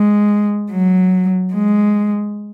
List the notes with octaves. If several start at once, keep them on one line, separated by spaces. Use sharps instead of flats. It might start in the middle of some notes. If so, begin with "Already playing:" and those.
Already playing: G#3
F#3
G#3